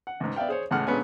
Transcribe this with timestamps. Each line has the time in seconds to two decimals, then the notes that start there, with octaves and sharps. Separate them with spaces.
0.07 F#5
0.20 C#2 G#2
0.36 B3 D5 E5 F5 G5
0.49 G#4 C5 C#5
0.71 C#2 A2 G#3 F#5 F6
0.87 A#2 D3 G#3 B3 C#4 G#5